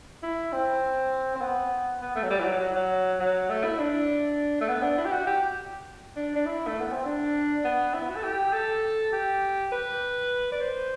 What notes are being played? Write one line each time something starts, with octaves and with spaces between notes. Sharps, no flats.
E4
C4
C4
B3
B3
A3
F#3
G3
E3
F#3
F#3
F#3
F#3
A3
E4
D4
A3
B3
D4
E4
G4
F#4
G4
D4
D4
E4
A3
B3
C4
D4
B3
E4
F#4
A4
G4
A4
G4
B4
D5
C5